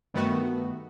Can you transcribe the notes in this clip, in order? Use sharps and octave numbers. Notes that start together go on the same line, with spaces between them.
G2 D#3 A3 B3 F#4